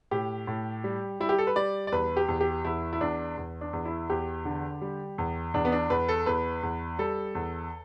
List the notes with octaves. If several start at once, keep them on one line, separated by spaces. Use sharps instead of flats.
A2 G4
A2
G3
G3 E4
G4
A4
B4
G3 D5
D5
E2 B4
G4
E2
G4
E2 E4
E4
E2 D4
E2
D4
E2
E4
E2 G4
D3
G3
E2
E2 D4
B3
D4
E2 B4
A4
E2 B4
E2
G3 A4
E2